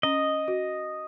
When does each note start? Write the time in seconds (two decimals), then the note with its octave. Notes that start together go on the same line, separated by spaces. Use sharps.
0.03 C#4 D#5
0.48 F#4